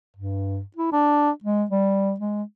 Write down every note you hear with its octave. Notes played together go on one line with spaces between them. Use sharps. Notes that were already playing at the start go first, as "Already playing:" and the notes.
G2
E4
D4
G#3
G3
G#3